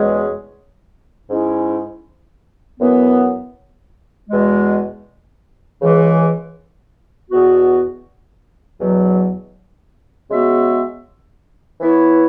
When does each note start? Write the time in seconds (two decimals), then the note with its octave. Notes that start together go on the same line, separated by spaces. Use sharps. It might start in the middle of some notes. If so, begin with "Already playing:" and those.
Already playing: E2 B2 G#3 C#4 G#4
1.30 G#2 G#3 C#4 E4
2.80 F#2 E3 B3
4.30 E2 B2 G#3
5.81 C#2 C#3 E3 G#3
7.31 E2 B2 B3 F#4
8.81 E2 B2 F#3
10.30 C#3 G#3 B3 F#4 E5
11.80 E3 B3 E4 C#5